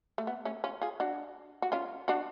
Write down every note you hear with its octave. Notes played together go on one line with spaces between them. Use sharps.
A3
B3
A3 C#4
C#4 F4
F4 G#4
D4 F#4
F#4
C#4 F4
D4 F#4